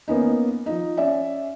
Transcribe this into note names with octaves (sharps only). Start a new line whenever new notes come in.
A#3 B3 C#4 D#4
F3 D#4
C#4 D5 E5